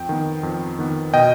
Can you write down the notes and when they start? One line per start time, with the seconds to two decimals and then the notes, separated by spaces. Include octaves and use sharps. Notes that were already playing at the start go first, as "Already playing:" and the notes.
Already playing: F2 G5
0.09 D#3 B3
0.43 F2
0.79 D#3 B3
1.14 B2 D#5 G5